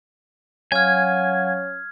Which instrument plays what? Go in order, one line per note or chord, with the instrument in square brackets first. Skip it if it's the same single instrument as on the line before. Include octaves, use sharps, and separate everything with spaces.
[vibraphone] F#3 F5 F#5 [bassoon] C#4 [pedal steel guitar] G#5 [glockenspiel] F6 G#6